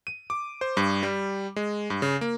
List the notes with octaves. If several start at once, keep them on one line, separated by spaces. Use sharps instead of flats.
D#7
D6
C5
G2
G3
G#3
G2
C#3
A#3